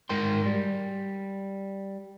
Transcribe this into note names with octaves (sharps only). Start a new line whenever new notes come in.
G#2 A#4 G5 C6
G3